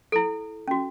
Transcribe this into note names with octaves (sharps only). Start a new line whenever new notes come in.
E4 A4
C#4 F#4